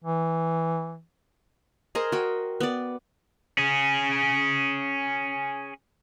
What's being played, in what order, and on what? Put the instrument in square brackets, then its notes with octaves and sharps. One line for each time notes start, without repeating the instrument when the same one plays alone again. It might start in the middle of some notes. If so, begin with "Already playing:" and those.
[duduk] E3
[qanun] G#4 A#4 C5 D#5
F#4 G5
B3 D5
[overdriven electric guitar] C#4 G#4